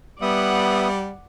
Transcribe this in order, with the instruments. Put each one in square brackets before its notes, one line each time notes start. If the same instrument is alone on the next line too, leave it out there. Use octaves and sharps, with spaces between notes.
[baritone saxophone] G3 [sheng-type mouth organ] B3 E5 D#6 [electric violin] D5 F#5